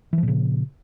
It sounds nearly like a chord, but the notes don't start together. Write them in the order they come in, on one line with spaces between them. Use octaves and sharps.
E3 F3 A#2 C#3